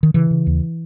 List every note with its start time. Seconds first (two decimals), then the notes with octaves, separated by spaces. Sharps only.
0.03 D#3
0.14 C#3 E3
0.31 C#3
0.47 D#2